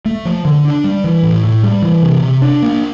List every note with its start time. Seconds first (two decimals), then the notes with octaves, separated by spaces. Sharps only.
0.06 A3
0.25 F3
0.45 D3
0.65 D4
0.84 G3
1.04 E3
1.23 A2
1.44 A2
1.63 G3
1.82 E3
2.03 C3
2.22 C3
2.42 D4
2.62 A#3